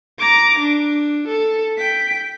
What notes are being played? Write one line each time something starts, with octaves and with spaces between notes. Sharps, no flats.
A#5 D6
D4
A4
G5 B6